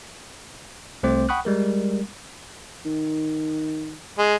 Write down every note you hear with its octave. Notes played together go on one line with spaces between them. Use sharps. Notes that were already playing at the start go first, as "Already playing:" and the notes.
C2 A3 C4 C5 D6
F#5 G5 B5 C#6 D#6 F#6
G3 G#3 A#4
D#3
G#3